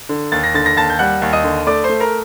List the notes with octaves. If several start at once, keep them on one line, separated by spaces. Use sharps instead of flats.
D3
D#2 A6
A#6
D3 A6
A#6
D#2 A5 A6
G6
G3 F#5 F#6
D#2
D#5 D#6
D3
A3 D5 D6
C5 C6
A3
A#4 A#5